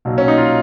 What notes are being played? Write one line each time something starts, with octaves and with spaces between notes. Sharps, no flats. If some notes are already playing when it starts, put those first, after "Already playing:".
B1 A#2 F#3
C#4
D#4
F4